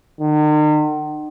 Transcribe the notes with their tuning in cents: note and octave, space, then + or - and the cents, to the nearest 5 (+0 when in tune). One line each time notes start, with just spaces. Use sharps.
D#3 -45